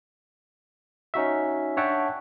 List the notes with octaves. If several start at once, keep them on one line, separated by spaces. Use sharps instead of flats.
C#4 D#4 F#4 E5
D4 C#5 E5 F#5 G5 A5